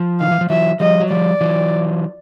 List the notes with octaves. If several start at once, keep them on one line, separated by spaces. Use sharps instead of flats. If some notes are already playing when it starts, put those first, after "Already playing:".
Already playing: F3
D#3 F5
E3
F3
E3 F#3 E5
F3 G3 D#5
F#3
F3 G3 D5
E3 F#3